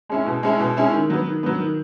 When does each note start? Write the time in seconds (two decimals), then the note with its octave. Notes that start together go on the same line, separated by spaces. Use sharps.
0.09 G#3 C#4 E4
0.26 B2
0.43 G#3 C#4 E4
0.60 B2
0.77 G#3 C#4 E4
0.93 D#3
1.10 F#3 B3
1.26 D#3
1.43 F#3 B3
1.60 D#3